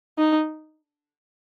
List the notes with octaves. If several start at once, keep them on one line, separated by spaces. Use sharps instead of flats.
D#4